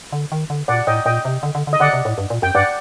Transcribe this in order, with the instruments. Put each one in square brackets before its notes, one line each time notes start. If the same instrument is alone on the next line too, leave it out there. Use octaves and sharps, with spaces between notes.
[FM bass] D3
D#3
D3
[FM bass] A#2 [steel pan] D5 F#5
[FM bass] A2 [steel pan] D#5 G5
[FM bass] A#2 [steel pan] D#5 G5
[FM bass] C3
D3
D3
D3
[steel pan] D#5
[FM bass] D3 [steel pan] D5 F#5
[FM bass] C3
A2
G2
A#2
[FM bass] F#2 [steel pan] G5
[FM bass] G2 [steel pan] D5 F#5